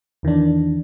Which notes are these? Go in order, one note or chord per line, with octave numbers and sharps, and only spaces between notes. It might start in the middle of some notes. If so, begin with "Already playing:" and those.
E2 D#3 E3 D4